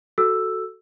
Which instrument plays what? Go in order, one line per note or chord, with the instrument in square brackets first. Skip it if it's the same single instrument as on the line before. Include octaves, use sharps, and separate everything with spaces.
[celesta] F#4 A4 E6